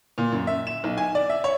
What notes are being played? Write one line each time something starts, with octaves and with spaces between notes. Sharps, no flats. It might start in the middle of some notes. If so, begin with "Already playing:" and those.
A#2
F#2
E5
E7
B1
G#5
D5
E5
C#5